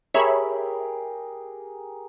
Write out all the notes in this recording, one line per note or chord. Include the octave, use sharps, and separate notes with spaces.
G4 G#4 A#4 C#5 E5 B5